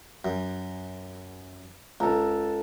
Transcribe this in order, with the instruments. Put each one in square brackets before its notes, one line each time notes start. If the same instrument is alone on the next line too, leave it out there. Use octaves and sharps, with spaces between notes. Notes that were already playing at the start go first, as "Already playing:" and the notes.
[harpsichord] F#2
[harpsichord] C#2 [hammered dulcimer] A4 A5 A#5